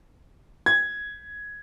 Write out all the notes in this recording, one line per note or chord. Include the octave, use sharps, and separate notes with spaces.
G#6